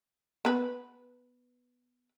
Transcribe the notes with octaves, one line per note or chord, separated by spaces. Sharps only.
B3 B4